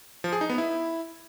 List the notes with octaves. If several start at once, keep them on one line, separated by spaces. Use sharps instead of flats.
F3
G#4
D#4
B3
E4